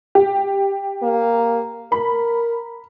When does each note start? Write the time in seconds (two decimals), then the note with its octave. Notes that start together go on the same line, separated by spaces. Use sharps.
0.15 G4
1.03 A#3
1.92 A#4 B5